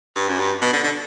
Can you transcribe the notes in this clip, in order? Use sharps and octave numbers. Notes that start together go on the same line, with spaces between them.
G2
F#2
G2
B2
D3
D3